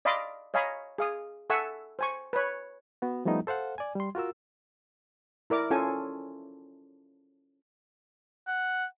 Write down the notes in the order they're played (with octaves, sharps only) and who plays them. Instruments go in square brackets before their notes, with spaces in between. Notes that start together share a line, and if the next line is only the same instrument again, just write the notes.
[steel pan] D5 D#5 F5 B5 C6 D6
C#5 D#5 F5 G#5 A#5 B5
G#4 F5 D#6
A4 E5 F#5 G#5 C#6 E6
C5 G#5 C#6
B4 C#5
[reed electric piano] B3 F#4
F3 G3 A3 B3 D#4 E4
A4 C5 F5 F#5
D5 G#5
G3 C6
F4 F#4 A#4 E6
[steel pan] E4 A#4 D5 D6
C#4 F4 A4 G#5
[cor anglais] F#5